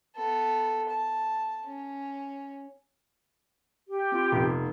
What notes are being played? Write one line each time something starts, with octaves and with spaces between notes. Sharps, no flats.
B3 A4
A5
C#4
G4
C4 F4 C6
F1 B3 D#4